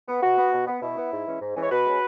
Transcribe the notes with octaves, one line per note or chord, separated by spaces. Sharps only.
B3
B2 F#4
B3
B2
B3
B2 E4
B3
G#2
E3 G#3 C#4
G#2
E3 G#3 C#4
C#5
B2 F#4 B4
G#3 C#4